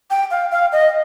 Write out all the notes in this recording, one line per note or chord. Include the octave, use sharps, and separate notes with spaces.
G5
F5
F5
D#5